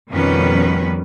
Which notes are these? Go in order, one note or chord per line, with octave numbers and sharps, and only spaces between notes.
F2 B2 D#3 G3 C#4 B4